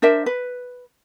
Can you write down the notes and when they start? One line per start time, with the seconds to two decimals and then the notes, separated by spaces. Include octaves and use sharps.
0.02 D4 A#4 C5 E5
0.26 B4